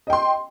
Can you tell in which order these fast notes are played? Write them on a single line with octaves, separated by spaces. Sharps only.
D#5 G5 C6